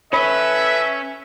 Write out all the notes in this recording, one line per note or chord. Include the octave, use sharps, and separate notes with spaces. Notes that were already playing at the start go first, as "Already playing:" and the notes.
E3 C#4 A4 B4 C#5 E5 B5